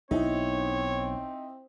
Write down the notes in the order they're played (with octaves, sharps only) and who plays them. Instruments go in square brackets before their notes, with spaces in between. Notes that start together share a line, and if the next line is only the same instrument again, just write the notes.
[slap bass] B1 [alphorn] C4 [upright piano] D#4 E4 [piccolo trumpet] C#5